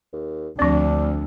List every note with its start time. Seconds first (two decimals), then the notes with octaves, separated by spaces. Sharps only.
0.13 D#2
0.59 D2 F3 C4 D4